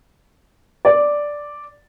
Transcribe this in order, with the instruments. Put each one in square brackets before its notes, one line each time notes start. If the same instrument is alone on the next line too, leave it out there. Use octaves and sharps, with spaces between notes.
[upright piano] D5